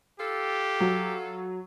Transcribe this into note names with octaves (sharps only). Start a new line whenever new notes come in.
F4 G4 A4
F#3